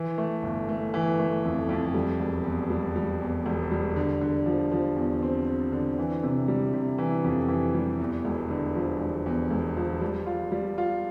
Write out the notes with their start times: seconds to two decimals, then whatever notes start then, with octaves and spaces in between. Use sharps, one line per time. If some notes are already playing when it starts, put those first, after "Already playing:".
Already playing: E3
0.18 A3
0.43 G1
0.69 A3
0.94 E3
1.19 A3
1.44 F2
1.69 F2
1.94 G3
2.19 E1
2.44 E2
2.70 G3
2.96 G3
3.21 E2
3.46 E1
3.72 G3
3.96 D3
4.21 D3
4.46 F3
4.71 F3
4.96 E2
5.22 C4
5.47 C4
5.72 D3
5.99 E3
6.23 C3
6.48 G3
6.73 C3
6.98 E3
7.24 F2
7.49 E3
7.74 G3
8.00 E2
8.25 E1
8.50 D3
8.75 F3
9.00 E1
9.26 E2
9.50 E1
9.77 F3
10.01 G3
10.26 F4
10.52 G3
10.78 F4